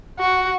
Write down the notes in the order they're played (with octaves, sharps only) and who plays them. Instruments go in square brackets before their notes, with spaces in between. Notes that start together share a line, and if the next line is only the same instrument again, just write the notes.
[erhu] F#4